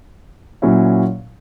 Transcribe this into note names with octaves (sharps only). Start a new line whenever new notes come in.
A#2 F#3 C#4 E4